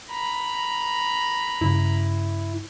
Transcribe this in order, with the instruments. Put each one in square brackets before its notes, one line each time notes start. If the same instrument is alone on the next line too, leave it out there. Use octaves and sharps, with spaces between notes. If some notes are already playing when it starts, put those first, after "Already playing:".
[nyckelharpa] A#5 B5
[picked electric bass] G2 C#3 [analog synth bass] E4